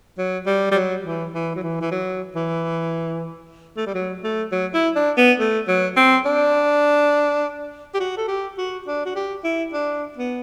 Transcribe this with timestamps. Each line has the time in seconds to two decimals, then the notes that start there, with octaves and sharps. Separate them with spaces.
0.18 F#3
0.47 G3
0.72 G3
0.75 F#3
1.05 E3
1.34 E3
1.55 F#3
1.63 E3
1.81 E3
1.91 F#3
2.35 E3
3.77 A3
3.86 G3
3.94 F#3
4.24 A3
4.51 F#3
4.74 E4
4.96 D4
5.17 B3
5.40 A3
5.67 F#3
5.96 C4
6.25 D4
7.94 G4
8.00 F#4
8.17 A4
8.28 G4
8.58 F#4
8.87 D4
9.05 F#4
9.15 G4
9.44 E4
9.73 D4
10.17 B3